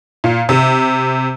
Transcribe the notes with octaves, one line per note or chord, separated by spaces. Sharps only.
A#2
C3